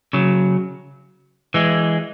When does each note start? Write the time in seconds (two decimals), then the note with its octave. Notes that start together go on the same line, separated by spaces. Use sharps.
0.13 C#3 F#3
1.54 E3 G#3